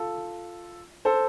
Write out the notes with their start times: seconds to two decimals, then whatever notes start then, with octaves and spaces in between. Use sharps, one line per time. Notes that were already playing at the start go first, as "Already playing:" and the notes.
Already playing: F4 A4
1.05 A4 C5